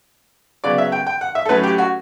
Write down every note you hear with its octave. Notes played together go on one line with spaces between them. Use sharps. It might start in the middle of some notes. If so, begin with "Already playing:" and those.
C#3 F#3 B3 D5
E5
G5
G5
F#5
E5
A4
A2 F#3 A3 C#4 B4
G4
F#4